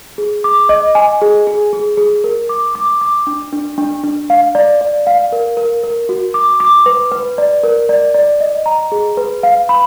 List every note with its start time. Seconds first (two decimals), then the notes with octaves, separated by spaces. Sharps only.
0.18 G#4
0.44 D6
0.69 D#5
0.95 G#5
1.21 G#4
1.47 G#4
1.73 G#4
1.97 G#4
2.24 A#4
2.49 D6
2.75 D6
3.01 D6
3.27 D4
3.52 D4
3.78 D4
4.04 D4
4.30 F5
4.55 D5
4.81 D5
5.07 F5
5.32 A#4
5.57 A#4
5.84 A#4
6.09 F#4
6.34 D6
6.60 D6
6.86 B4
7.12 B4
7.38 D5
7.63 A#4
7.89 D5
8.14 D5
8.40 D#5
8.66 A#5
8.92 G#4
9.17 B4
9.43 F5
9.69 B5